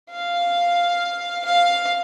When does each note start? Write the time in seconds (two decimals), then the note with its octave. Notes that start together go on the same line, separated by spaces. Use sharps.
0.10 F5
1.45 F5